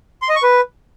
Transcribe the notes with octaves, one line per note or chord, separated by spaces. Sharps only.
C6
D#5
C#6
B4